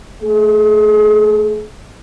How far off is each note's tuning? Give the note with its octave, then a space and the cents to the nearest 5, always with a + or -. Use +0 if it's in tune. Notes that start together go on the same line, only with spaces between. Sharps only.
A3 +0 G#4 +35